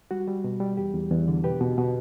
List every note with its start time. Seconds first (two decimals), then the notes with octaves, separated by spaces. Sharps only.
0.11 G3 F#4
0.28 G3
0.44 B2
0.60 G3
0.77 E2 G4
0.94 E2
1.11 E2
1.28 D3
1.44 B2 G4 B4
1.61 B2
1.78 B2